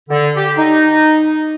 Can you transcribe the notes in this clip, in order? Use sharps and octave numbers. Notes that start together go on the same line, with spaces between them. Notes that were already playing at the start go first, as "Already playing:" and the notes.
D3
G4
D#4